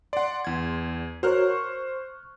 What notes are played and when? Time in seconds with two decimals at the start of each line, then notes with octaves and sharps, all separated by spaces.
0.13 D5 F#5 C6
0.44 E2 G#6
1.23 F#4 A#4 C5 C#5 F6 F#6
1.51 C#6